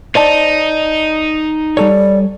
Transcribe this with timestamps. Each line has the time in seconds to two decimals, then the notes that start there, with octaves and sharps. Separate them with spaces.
0.15 D#4 C5 D5 A5
1.77 G3 A4 C#5 D5